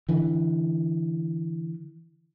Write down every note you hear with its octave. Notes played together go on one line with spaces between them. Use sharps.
D3 E3